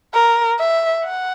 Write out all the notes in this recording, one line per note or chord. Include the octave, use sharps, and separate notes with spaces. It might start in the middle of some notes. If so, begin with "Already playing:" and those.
A#4
E5
F#5